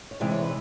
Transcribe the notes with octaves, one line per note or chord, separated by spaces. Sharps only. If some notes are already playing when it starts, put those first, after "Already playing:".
C#5
C3 E3 G#3 D5
C#5
B4